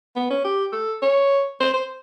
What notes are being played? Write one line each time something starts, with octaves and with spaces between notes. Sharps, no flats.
B3
C#4
G4
A4
C#5
C5
C5